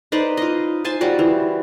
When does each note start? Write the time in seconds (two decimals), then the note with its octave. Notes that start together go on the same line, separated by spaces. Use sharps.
0.12 D#4 B4 C5 D5
0.37 F4 D#5
0.84 C5 G#5 A5 C6
1.01 F3 G3 F#4 C5
1.19 E3